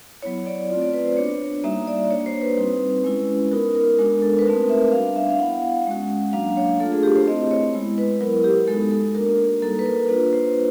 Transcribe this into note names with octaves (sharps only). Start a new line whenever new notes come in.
F#3 B3 E4 C#5
D5
A3 C4 F4 D5
D5
B4
C5
B3 D4 F#4 C#5
G3 A#3 D#4 F#4 E5
D5
A#3 D4 F#4 C#5
C5
B4
G3 C4 D#4
G#3 C#4 E4
B3 D#4 F#4 A#4
A#4
G#3 B3 D4 F#4 A#4
A4
B4
A3 C4 D#4 F#4 A#4
E5
G3 B3 D4 F5
E5
F5
B3 E4 F#5
G#3 C#4 F#4
F#3 A#3 D4 F5
C#5
A3 D4 F4 A4
G#4
G4
C5
A3 C4 E4 D#5
C#5
G#3 B3 E4
B4
F#3 B3 E4 A#4
G4
G#3 B3 D#4 F#4 A4
A4
A#3 D4 F#4 A#4
G3 A#3 D#4 F#4 A4
B4
A#4
A#3 D4 F4 B4
C5